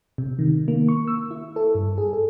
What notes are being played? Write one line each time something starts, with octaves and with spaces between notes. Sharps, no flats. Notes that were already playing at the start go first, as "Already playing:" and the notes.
C3
D#3
A#3
C#6
E6
E4
A4
G2
G#4
A4